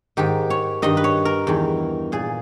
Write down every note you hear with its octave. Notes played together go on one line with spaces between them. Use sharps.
G#2 D#3 G4
C#5
G2 D#3 D#5
B4
C#5
A#4
E2 D#3
A#2 G#4